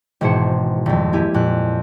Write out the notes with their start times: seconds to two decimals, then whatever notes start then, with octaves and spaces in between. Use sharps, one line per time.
0.21 G#1 B2 E3 G#4 C5 C#7
0.86 D#1 F2
1.13 A#3 E4 G4 G#5
1.34 F2 A#2 F#6